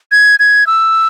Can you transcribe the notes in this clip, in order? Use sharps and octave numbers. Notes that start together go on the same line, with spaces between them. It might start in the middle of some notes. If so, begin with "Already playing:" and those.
G#6
G#6
E6